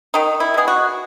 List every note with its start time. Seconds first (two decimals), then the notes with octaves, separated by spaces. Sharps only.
0.14 D#3 D#4
0.40 E4
0.54 G#3 B3 G#4
0.68 F#4